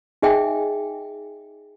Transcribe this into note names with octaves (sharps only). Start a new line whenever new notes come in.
D#4 G#4 D#5 E5 G5 G#5